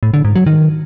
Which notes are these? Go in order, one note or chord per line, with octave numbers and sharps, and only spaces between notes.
A2
D3
G#2
F#3
D#3